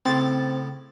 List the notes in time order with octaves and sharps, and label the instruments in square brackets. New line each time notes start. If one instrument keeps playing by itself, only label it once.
[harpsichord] A2 C#3 [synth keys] C4 A6